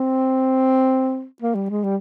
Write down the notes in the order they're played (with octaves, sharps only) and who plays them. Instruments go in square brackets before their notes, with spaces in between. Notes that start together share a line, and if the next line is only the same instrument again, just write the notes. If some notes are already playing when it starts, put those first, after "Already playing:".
Already playing: [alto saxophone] C4
A#3
G3
G#3
G3